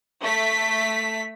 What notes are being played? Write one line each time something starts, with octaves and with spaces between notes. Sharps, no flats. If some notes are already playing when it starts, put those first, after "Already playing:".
A3 B6